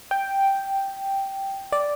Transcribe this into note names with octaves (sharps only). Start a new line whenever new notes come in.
G5
D5